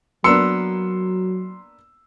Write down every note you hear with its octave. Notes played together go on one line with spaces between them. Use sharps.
F#3 A#3 B3 D4 C6 E6 C#7